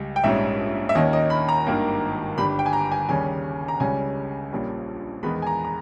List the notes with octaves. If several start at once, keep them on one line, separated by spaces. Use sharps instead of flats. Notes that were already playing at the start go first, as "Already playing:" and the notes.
Already playing: C#2 G3
G5
A#1 G#2 G3 C#4 E5
E5
D#2 D#3 A#3 C#4 D#5
D#5
B5
A#5
G#1 G2 D#3 A#3
G1 G2 G3 B5
G5
G#5
A#5
G#5
D#2 C#3 G3 C#4 G#5
A#5
C#2 C#3 G3 C#4 G#5
A#1 A#2 G3 C#4
E2 D#3 G#3 B3 B5
G#5
A#5
A#5